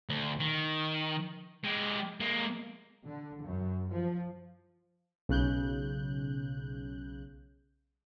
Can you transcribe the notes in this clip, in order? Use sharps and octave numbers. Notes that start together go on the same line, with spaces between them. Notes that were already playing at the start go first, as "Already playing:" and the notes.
D2
D#3
G#3 G4
G#3 A#3
D3
F#2
F3
B1 C#3 F#6 G6